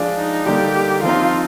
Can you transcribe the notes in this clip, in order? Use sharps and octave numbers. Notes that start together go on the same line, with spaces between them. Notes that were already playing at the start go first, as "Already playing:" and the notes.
Already playing: F3 G#3 D4
D#4
D3 G3 A#3 D#4 G4
F3 C4 D#4 F4